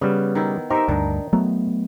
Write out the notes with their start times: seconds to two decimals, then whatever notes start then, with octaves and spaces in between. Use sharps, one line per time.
0.01 C#3 G3 B3
0.35 D#3 E4
0.70 D#4 G4 A#4 C5 E5
0.88 D2 G2 D#3 D4
1.33 F#3 A3 B3 A#5